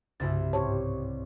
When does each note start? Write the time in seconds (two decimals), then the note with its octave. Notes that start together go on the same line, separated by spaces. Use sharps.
0.20 C2 G2 C#3 E4 A6
0.53 G#2 G4 C5 C#5 A5